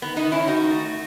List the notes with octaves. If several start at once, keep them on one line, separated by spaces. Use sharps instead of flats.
D#3 B3
B3 D#4
D#3
C#4 E4
D#3 D#4 F#4
A3